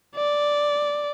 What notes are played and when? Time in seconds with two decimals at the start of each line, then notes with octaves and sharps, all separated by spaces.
0.16 D5